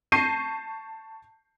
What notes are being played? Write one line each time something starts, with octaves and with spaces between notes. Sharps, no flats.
A5 C#6 G6 A#6 C7 D#7